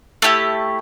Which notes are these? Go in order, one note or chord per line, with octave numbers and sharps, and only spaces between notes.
A3 E4 G4 A5